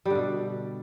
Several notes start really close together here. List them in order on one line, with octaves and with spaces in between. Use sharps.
G3 D3 B2